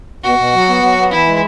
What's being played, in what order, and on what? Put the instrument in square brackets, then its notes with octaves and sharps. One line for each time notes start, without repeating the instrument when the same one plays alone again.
[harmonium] B2 [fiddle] F#4
[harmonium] B2
F#3
B3
F#3
B3
[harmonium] E3 [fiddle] E4
[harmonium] G#3